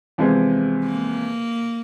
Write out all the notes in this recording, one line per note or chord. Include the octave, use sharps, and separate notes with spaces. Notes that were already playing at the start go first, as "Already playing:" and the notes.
E2 C3 F3 G#3
A#3